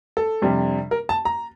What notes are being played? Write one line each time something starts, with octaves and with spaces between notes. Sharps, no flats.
A4
F2 C3 G3 D4
A#4
A5
A#5